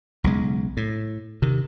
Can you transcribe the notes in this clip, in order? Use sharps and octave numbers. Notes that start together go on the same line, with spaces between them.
B1 C#3 G#3
A2
C3 D#3